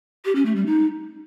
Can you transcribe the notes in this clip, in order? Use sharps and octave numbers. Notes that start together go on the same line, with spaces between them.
G4
C#4
A3
G3
D#4